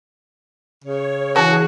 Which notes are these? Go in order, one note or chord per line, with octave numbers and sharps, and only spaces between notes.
C#3 C#5
E3 C#4 F#4 G#4 A5